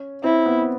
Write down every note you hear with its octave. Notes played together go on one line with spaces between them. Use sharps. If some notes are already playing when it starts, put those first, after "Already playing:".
Already playing: C#4
C4 E4
B3